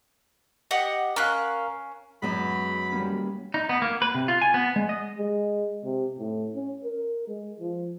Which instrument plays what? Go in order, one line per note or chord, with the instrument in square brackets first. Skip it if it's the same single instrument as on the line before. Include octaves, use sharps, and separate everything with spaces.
[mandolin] G4 D#5 F#5
[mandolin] C#4 F#6 [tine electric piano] A#4 F5
[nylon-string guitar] F#2 F#3 B3 [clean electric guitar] G#3 [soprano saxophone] B5
[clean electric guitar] G3 A#3 C#4
D#4
B3
A#3
B4
C3
F4
G#5
B3
G#3
D#5
[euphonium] G#3
C3
A2
C#4
A#4
G#3
F3